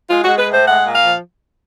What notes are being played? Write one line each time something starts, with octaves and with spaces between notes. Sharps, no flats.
G#3 F4
G#3 F#4
B4
A2 C5
G#3 F#5
A#2
F5
F3